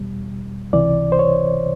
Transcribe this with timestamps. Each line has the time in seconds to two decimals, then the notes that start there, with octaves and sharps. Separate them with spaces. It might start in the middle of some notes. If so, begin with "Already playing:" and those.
Already playing: E2 B2 G3
0.73 C#2 C3 E3 D5
1.12 C5
1.19 C#5